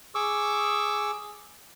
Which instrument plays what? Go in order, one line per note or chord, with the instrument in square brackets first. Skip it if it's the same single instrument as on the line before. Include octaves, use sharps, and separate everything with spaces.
[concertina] G#4 C#6 D6 E6